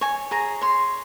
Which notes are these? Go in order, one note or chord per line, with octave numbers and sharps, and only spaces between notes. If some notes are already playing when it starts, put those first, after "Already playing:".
C#5 G#5
G#4 A#5
C#5 C6